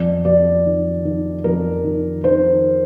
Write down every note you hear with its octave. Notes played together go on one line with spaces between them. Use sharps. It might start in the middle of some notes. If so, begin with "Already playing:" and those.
Already playing: F2 D5
F2 D5
D#3
D#3
F2 A#4
D#3
D#3 C5